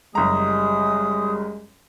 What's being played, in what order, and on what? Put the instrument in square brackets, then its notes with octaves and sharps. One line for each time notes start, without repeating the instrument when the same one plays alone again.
[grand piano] F#1 A#5 [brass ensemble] G3 G#3 [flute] D#6